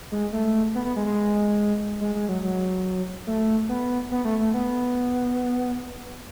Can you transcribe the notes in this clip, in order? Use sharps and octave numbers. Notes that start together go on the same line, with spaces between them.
G#3
A3
B3
B3
G#3
G#3
G#3
G#3
F#3
F#3
A3
B3
B3
A3
A3
B3